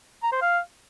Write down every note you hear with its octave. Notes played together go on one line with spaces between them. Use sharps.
A#5
C5
F5